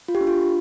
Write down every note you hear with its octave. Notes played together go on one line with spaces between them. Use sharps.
F4
G4
D4
F4